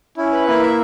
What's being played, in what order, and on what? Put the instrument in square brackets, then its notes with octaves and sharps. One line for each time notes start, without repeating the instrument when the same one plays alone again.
[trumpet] C#4 [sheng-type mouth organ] E4
[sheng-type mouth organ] B4
[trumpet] A#3 [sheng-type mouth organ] E4
[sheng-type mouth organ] E5